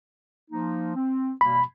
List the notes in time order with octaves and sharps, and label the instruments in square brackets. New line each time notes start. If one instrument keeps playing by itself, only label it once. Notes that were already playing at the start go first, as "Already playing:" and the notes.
[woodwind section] F3 A#3 D#4
C4
[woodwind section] B2 G3 A#3 [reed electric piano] B5